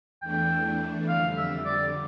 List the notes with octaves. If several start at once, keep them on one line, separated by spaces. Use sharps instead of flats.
E2 E3 A3 D4 G5
F2 D3 G3 F5
E5
D5